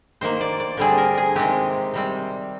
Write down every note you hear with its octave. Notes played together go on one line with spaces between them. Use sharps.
D#3 A#3 C5
D5
D5
D3 G3 C4 G#4
A#4
G#4
C3 D#3 G#3 C4 G4
C3 G3 C4